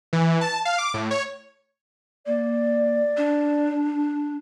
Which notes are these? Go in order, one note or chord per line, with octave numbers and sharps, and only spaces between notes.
E3
A5
F5
D6
A2
C#5
A#3 D5
D4